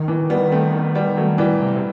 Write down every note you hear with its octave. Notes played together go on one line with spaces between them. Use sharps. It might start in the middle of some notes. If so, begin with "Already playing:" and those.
Already playing: D#3
E3
G3 B3
A3 C4
G3 B3
F#3 A3
E3 G3
C3